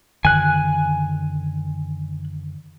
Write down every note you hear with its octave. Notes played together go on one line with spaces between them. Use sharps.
F#2 D3 D#3 G#5 F#6